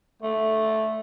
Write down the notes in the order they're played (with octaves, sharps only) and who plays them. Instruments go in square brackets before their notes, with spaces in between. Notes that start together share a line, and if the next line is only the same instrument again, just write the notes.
[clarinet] A3 [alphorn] A4